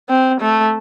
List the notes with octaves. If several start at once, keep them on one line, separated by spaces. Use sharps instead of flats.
C4
A3